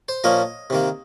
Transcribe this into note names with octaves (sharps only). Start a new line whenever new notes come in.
C5
A#2 F3 A#3 C#4 D#5
C3 D#3 A#3